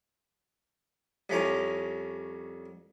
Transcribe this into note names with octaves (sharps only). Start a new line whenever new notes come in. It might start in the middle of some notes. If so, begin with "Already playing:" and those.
C2 F2 C#4 A#5